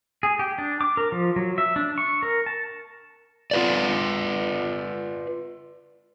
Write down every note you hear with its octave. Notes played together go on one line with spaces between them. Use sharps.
G#4
G4
D4
D6
A#4
F3
F#3
E5
D4
C#6
A#4
A5
F4 B4 D5